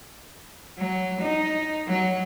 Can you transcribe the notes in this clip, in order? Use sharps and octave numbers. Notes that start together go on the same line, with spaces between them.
F#3
D#4
F#3